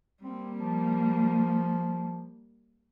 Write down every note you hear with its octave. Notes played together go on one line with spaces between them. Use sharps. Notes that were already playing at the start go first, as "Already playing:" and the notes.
G3 A#3 C4
F3